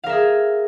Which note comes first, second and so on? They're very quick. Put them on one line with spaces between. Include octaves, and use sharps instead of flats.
F5 A#4 E5 G#4